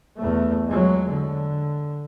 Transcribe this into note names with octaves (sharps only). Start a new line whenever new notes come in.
E2 A3
F#3 G#3
D3